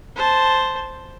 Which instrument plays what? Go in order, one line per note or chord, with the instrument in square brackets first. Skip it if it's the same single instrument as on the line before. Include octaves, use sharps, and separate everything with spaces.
[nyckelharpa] C5 A5